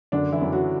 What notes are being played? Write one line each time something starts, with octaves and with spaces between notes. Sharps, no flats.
F#2 D3 D4
E3 E4
F#2
F#3 F#4